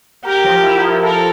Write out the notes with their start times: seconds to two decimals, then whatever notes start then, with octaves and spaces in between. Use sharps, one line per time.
0.25 G4 A#4
0.44 F3
0.63 E4
0.82 F3
1.02 A4 A#4